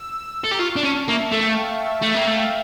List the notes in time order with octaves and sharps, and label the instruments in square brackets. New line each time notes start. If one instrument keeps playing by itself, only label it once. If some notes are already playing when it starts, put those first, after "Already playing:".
Already playing: [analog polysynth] E6
[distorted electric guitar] A4
[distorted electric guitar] G4 [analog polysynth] A#5
[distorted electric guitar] F4 [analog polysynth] C#6
[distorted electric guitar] D4
[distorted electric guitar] C#4 [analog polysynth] A5
[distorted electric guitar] A#3 [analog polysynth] E5
[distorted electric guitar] A3
[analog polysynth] G5
F5
E5
[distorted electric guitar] A3 [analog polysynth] E5
[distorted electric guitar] A#3 [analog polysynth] G5
[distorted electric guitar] A3 [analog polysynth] F5